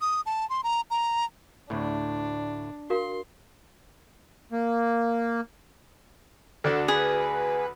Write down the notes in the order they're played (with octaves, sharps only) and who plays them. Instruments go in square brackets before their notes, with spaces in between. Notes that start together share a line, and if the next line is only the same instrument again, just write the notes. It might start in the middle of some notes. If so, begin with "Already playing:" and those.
[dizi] D#6
A5
C6
A#5
A#5
[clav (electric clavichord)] D2 A2 [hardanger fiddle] D4
[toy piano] F#4 A#4 F5 [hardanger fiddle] C6
[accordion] A#3
[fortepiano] D2 D4 F#4 [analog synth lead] A4
[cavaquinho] G#4 [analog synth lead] B4